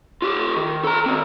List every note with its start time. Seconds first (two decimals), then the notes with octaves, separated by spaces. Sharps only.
0.22 F4 G4
0.57 D#3
0.84 A4 A#5
1.06 D#3 C4